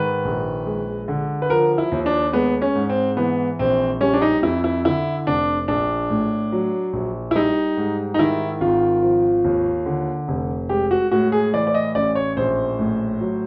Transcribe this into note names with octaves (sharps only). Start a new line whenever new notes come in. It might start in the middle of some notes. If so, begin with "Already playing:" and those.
Already playing: G#2 D#3 B4
A#1
G#3
D3
B4
F3 A#4
E4
D#2
D4
G#3 B3
C#4
G#2
C4
E3 B3
A#1 C4
G3 C#4
D4
D#4
F2 E4
E4
D3 E4
F1 D4
A#1 D4
A2
F#3
A#1
E4
G3 D#4
G#2
D#4
D#3 E4
G#1 F4
F3
D#2
D3
F1
G#3 G4
F#4
A2 F#4
G#4
E3 D5
D5
D#5
A1 D5
C#5
A#1 C5
A2
F#3